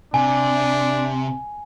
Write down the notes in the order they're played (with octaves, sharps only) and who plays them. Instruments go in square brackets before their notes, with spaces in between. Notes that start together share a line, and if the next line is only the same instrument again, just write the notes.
[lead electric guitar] C3 [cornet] D4 [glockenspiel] G#5